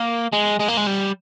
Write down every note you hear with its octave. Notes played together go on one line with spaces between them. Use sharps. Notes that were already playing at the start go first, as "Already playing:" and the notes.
Already playing: A#3
G#3
G#3
A#3
G#3
G3